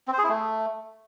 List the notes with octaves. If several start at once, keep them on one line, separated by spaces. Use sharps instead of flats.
C4
C5
G#4
E4
A3